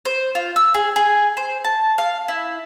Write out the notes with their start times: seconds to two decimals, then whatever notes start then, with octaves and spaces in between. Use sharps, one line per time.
0.05 C5
0.35 F4
0.56 E6
0.74 G#4
0.96 G#4
1.37 C5
1.64 A5
1.98 F5
2.28 E4